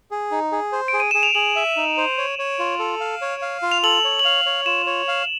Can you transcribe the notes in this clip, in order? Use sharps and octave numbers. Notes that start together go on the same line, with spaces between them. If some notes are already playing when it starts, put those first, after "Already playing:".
G#4
D#4
G#4
C5
D7
G#4
D#7
G#4 E7
F7
G#4 F#7
E5
D#4
C5
C#5
C#5
F4
A4
F5
C#5
F5
F4
F7
A4 F#7
C#5
F#7
F5 F7
C#5
F4 E7
C#5
F5